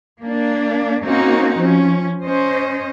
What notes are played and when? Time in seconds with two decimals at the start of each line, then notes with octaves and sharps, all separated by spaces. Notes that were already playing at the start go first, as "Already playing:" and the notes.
0.20 A#3 D4
1.02 A#3 C4 C#4 D#4 F#4
1.58 F3 C#4
2.23 C#4 C5 D#5